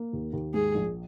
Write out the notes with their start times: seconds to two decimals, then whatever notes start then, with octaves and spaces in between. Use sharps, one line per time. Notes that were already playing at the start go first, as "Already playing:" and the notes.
Already playing: A#3
0.13 D#2
0.33 D#2
0.54 G#2 G#4
0.75 A#1